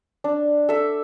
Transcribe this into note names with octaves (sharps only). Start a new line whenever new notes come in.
D4
A4 E5